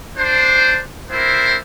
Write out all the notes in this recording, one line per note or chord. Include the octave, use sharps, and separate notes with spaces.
D4 C5
C4 D4 E4 A#4 C5